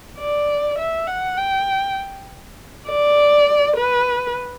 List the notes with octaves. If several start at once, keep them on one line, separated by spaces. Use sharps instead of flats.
D5
E5
F#5
G5
D5
B4